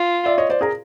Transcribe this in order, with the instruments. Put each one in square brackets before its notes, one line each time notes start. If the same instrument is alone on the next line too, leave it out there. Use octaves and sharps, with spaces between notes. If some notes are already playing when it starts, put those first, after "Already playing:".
Already playing: [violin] F4
[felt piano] D5 E5
C#5 D#5
C5 D5
G#4 A#4